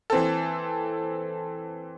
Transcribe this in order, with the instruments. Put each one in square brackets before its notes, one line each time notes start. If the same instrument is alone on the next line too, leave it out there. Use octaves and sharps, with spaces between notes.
[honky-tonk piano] E3 C4 A4